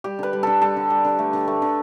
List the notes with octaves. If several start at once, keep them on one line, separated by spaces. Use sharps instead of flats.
G3 G4
D3 B4
G3
D3 A4
G3 A4
D3
G3
D3
A3
D3
A3
D3